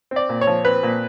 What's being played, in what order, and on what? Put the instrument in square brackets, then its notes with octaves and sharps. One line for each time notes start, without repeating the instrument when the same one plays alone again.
[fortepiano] C4
D5
A#2
C#5
F3
C4 B4
A#2